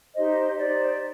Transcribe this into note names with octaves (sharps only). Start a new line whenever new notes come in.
D#4 G4 C5 D#5
D#4 G4 C5 D5